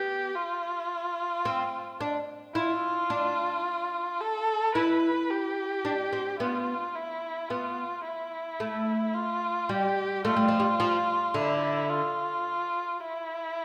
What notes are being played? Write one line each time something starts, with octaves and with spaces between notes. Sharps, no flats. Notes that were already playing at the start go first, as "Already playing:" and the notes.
Already playing: B3 G4
F4
C4
D4
E4 F4
D4
A4
E4 B4
G4
D4
C4
B3 F4
E4
B3 F4
E4
A3
F4
G3 G4
A3 F4
G3
F3
G3
F3
D3 E4
F4
E4